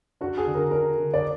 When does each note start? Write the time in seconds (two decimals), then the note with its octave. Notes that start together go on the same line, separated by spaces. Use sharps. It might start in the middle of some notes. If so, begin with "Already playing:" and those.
0.21 D4 F#4
0.38 G#4
0.47 D3
0.55 A#4
0.71 D4 A#4
0.97 D3
1.14 D5